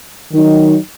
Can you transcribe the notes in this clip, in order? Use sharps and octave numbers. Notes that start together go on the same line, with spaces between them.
D#3 F#3 D#4